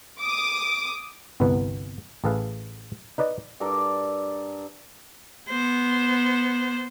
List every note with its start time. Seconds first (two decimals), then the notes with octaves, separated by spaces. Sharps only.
0.18 D6 D#6
1.40 G1 C2 B3 B4
2.24 A1 G#4 A4 B4 F5
3.18 D#4 B4 D5 D#5
3.60 G2 A4 A#4 D5
5.50 B3 C5